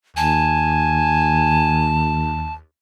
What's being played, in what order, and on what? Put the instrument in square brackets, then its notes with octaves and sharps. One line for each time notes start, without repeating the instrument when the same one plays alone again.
[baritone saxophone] D#2 [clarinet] G#5 [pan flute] A5